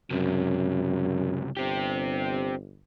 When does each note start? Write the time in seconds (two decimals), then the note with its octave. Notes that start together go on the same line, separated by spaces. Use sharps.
0.11 C#2 F#2 C3
1.57 G1 C4 G4